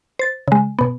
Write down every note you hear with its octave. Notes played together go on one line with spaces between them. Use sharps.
C5 A6
C#3 G#3
B2 B3